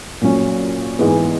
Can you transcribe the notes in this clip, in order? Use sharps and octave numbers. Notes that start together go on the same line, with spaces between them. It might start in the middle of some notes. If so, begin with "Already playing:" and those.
A#2 F#3 C#4
G#2 E3 G#3 B3